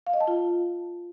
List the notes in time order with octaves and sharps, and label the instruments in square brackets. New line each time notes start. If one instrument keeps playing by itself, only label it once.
[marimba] F5
D#5
A5
F4